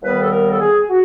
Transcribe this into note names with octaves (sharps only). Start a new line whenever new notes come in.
D#2 D#3 G3 B3 B4
A4
A#4
A4
G#4
F#4